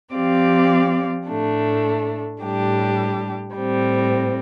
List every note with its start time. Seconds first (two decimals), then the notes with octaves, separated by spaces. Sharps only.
0.15 F3 C4 G4 D5 F5
1.28 A2 A3 D4
2.41 A2 G3 D4 G4
3.55 A2 G3 C4